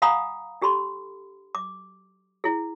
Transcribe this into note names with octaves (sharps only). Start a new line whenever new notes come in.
F5 F#5 G#5 A#5 B5 D#6
D4 G4 A4 B5 C6
D6
E4 G#4